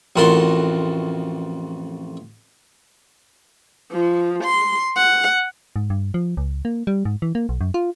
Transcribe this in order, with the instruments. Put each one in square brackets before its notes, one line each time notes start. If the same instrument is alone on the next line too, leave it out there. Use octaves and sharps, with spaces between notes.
[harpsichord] A1 F2 F#4 A#4 A5 C6
[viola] F3
C6
F#5
[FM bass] G#2
G2
F3
C#2
A#3
G3
G#2
E3
A#3
B1
F#2
F4